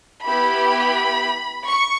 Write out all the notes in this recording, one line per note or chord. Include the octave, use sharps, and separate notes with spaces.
B3 E4 G4 B5
C#6